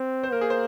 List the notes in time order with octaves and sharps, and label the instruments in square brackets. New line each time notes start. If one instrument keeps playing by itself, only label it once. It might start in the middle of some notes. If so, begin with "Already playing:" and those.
Already playing: [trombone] C4
[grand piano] C5
[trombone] A#3 [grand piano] A#4
[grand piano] G#4
C5